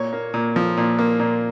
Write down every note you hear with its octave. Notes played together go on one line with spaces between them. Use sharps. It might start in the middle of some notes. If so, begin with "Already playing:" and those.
Already playing: A#2 C#5
A#3
A#2
F3
A#2
A#3
A#2